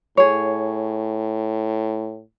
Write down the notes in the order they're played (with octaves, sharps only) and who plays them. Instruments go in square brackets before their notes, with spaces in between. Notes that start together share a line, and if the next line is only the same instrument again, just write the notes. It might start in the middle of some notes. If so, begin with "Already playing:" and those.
[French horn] A2 [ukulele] G#4 C#5